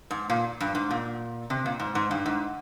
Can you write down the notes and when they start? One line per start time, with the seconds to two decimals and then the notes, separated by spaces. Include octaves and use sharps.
0.11 G#2
0.30 A#2
0.61 G2
0.75 G#2
0.91 A#2
1.50 C3
1.66 A#2
1.79 G#2
1.95 G#2
2.11 G2
2.26 G#2